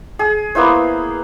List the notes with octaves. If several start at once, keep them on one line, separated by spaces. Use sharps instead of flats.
G#4
A#3 B3 E4 C5